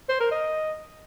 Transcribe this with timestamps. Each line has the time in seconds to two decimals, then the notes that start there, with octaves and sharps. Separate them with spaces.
0.09 C5
0.20 A#4
0.31 D#5